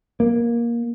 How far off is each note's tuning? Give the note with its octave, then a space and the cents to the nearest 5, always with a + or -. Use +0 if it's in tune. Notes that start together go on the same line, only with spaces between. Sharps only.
A#3 +15